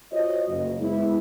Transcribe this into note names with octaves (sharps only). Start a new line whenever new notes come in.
F4 F#4 C5 C#5 D#5
F#1
G#3 B3 E4